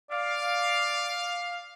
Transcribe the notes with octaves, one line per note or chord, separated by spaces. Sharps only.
D5 F5